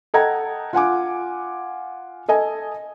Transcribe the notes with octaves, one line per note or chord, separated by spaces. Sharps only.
A4 D#5 F#5 G5 A#5 G#6
F4 F#5 G#5 D6
A4 D#5 G#5